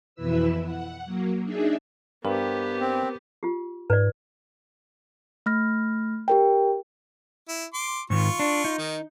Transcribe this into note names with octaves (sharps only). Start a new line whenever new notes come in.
F2 B2 E3 E4 B4 E6
F#5
F#3 A#3
D4 D#4 G#4 E5
G2 B3 G4 A#4 C5
C4
F4 G4
G#2 B4 D5
A3 B5 F6 A#6
G4 A#4 G5
E4
C6 D6
G#2 D#3 F4 C#6
D4
D#4
D#3